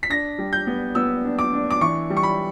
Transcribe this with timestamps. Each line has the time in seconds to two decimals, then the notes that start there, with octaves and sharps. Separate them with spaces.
0.03 B6
0.10 D4 A#6
0.38 G3
0.53 G6
0.67 B3
0.95 B3 E6
1.25 D4
1.39 D6
1.53 D4
1.71 D6
1.81 E3 C#6
2.10 G3
2.17 C#6
2.23 B5